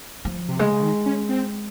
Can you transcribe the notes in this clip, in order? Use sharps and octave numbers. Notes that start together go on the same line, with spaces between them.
F3
C3
C#3 G#3
C#3
D#3
C#4
C4